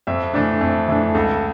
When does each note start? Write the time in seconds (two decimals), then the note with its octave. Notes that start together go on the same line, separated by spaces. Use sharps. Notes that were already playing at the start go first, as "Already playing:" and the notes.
0.07 F2 E5
0.34 E3 A3 D4
0.61 F2
0.88 E3 A3 D4
1.15 C#2 A4